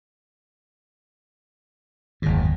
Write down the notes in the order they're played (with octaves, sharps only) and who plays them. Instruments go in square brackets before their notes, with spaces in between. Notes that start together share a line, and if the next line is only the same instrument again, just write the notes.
[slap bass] F#1 G#2 [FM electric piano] D#2